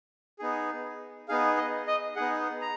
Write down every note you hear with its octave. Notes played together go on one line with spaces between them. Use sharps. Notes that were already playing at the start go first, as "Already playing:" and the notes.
B3 D#4 G#4
B3 D#4 G#4 F5
D#5
D#5
B3 D#4 G#4 F#5
A#5